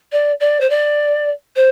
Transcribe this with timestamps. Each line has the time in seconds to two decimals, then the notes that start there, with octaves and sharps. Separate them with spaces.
0.12 D5
0.40 D5
0.61 C5
0.70 D5
1.56 C5